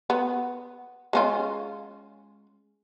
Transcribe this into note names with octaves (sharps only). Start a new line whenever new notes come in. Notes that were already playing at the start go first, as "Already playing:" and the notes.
B3
G#3 C#4 F4